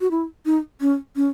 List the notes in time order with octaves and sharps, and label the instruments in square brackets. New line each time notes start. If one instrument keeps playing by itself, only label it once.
[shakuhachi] F#4
E4
D#4
C#4
C#4